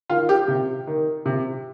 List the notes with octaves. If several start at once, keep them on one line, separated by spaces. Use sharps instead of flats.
D#3 F4
G4
C3
D#3
C3